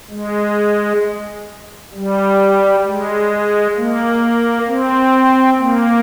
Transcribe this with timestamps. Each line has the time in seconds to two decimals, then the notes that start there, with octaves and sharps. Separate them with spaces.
0.11 G#3
1.94 G3
2.85 G#3
3.76 A#3
4.68 C4
5.59 A#3